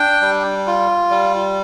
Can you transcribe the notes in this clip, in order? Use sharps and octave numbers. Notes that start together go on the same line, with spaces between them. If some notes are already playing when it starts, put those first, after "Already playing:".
Already playing: D4 G5
G3
F4
G3